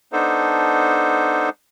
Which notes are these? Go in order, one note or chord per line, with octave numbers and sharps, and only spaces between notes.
B3 D4 D#4 A4 C5